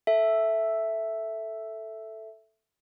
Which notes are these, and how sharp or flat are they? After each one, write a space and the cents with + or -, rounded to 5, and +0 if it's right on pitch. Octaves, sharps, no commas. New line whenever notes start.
A4 +0 E5 +0